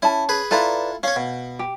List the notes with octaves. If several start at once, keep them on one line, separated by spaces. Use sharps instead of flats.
C#4 E4 A5
G#4 B4
E4 F4 A4 B4 D5 A#5
C#4 C#5 F5
B2
G4